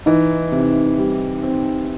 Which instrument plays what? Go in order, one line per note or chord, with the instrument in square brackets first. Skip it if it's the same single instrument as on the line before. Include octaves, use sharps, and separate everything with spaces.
[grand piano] E3 [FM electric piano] D#4
[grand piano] C3
G3
C4